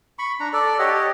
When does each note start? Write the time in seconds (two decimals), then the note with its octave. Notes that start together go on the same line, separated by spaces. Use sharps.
0.19 B5 C#6
0.40 D4 A#5
0.53 A4 D5
0.79 G4 C#5 D#5 F#5